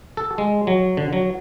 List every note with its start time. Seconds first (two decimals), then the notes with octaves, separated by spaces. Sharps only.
0.17 A4
0.38 G#3
0.67 F#3
0.97 D3
1.13 F#3